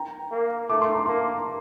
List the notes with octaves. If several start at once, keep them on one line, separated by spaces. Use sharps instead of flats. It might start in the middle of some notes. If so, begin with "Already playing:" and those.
Already playing: G5 A#5
A#3
A3 D6
C6
A#5
A#3 A5 C6